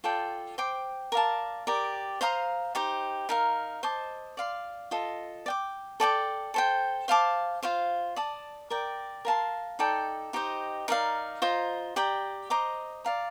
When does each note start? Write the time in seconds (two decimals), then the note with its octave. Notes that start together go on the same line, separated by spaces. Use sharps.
0.04 F4 A4 D5 G5
0.58 C5 G5 D6
1.12 A#4 D5 F5 A5
1.67 G4 A#4 D5
2.21 C5 F5 A#5 D#6
2.75 D#4 G4 C5
3.29 D#4 A#4 F5
3.83 C5 D#5 A5 D6
4.37 D5 F5 C6
4.91 F4 A4 D#5
5.46 D5 G5 D6
6.00 A4 D5 G5 D6
6.54 A4 C5 G5
7.08 C5 F5 A5 D6
7.63 F4 C5 F5
8.16 D5 A5 D#6
8.70 A#4 D5 G5
9.25 A#4 F5 A5 C6
9.79 D#4 A4 D5 G5
10.33 D#4 G4 C5 D#5
10.88 D#4 A#4 D5 F5
11.42 F4 C5 D#5 A#5
11.96 G4 D5 G5 A#5
12.50 C5 D#5 A#5 D6
13.04 D5 F5 A#5